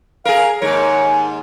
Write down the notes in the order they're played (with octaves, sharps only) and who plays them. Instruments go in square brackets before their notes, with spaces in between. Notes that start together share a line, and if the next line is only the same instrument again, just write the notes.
[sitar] G#4 A#4 [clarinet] F5
[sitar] D#2 G#2 A#4 [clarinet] C#5